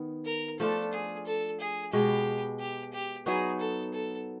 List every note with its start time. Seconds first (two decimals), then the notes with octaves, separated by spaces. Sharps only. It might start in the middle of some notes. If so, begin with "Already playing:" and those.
Already playing: D#3 B3
0.26 A#4
0.60 F3 A3 D4 F4 A4
0.93 G#4
1.26 A4
1.60 G#4
1.93 B2 G#3 B3 G4
2.60 G4
2.93 G4
3.26 F#3 B3 D#4 F#4 G#4
3.60 A4
3.93 A4